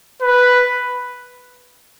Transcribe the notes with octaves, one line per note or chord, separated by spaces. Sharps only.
B4